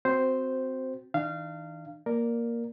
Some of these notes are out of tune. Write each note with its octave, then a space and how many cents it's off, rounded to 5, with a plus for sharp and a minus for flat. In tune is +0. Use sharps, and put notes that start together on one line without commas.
C4 -10 F#4 +0 C5 +0
E3 -45 D4 +40 F5 -20
A#3 +0 A#4 +0 D5 +0